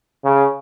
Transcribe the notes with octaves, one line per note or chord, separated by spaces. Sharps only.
C#3